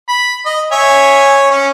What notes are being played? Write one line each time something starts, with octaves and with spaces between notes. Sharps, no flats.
B5
D#5
C#5 E5 G#5
C#4